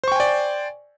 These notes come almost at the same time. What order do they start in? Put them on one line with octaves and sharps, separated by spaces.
C5 C#6 G5 G#5 D5